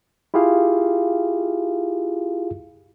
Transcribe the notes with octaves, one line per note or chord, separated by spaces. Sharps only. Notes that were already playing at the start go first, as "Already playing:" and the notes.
E4 F4 G4 G#4 F5